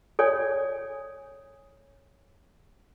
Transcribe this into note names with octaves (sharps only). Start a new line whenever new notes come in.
A4 C#5 D5 G#5